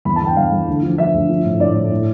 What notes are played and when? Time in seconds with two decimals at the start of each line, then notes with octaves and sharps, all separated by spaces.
0.05 E2 B5
0.16 A5
0.21 E2
0.27 G5
0.36 E2 F5
0.52 E2
0.68 D2
0.83 F3
0.98 F3 E5
1.14 D2
1.29 F3
1.45 A2
1.60 A2 D5
1.75 A2
1.91 A2